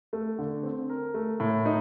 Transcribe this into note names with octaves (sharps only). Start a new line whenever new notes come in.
A3
D3
C4
A#4
A3
A2
D#4